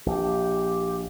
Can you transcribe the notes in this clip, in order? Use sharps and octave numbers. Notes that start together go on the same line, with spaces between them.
A#1 G4